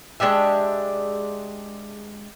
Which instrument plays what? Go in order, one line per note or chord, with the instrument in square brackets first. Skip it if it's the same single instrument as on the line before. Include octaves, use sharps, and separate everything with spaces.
[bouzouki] G#3 D4 G4 E5